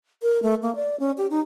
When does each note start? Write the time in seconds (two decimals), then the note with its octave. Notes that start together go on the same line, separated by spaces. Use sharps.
0.23 A#4
0.43 A3
0.62 A#3
0.76 D5
1.00 C#4
1.18 G4
1.30 D#4